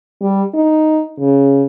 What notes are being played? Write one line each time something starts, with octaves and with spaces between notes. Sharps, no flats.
G3
D#4
C#3